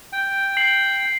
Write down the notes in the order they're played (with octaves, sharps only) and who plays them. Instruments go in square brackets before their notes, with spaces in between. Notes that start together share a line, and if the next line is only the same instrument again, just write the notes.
[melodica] G5
[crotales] C7 F#7